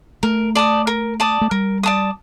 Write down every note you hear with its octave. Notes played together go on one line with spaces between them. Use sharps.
A3 A#4
D5 A5 D#6
A#4
D5 A5 D#6
A3
G3 A#4
D5 A5 D#6